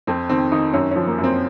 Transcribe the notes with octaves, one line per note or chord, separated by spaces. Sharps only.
F2 C4
D#3 C4
D#3 D#4
F#2 C#4
F3 C#4
A#3
F#2
C4